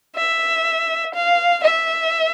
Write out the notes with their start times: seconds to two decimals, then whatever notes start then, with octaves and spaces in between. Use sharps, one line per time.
0.16 E5
1.15 F5
1.64 E5